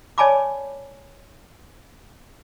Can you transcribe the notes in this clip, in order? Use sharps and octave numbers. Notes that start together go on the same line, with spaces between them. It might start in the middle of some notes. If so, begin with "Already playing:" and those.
C#5 D5 G#5 A5 B5 D6